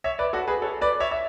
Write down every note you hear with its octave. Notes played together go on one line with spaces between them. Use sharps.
C#5 E5
B4 D5
F#4 A4
G#4 B4
A4 C#5
B4 D5
C#5 E5
E5